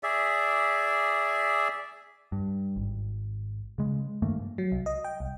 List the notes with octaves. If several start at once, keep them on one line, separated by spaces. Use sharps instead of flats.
G#4 D5 E5
G2
G#1
C#3 G#3
G2 D#3 A3 A#3
F#3
C2
D#5
G5
C2